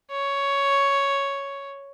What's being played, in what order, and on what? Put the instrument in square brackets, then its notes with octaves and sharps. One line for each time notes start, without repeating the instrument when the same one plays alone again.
[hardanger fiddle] C#5